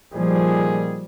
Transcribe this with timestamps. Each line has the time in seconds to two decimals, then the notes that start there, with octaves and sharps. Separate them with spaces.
0.14 A#2 D#3 F3 G3 G#4